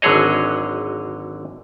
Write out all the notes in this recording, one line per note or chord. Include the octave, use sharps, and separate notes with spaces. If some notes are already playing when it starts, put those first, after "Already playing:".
G#1 D3 F#3 G#4 C#5 D#5